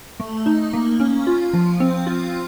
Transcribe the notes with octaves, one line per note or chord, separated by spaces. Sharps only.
A3
D#4
A#3
C#4
F4
F3
C4
F4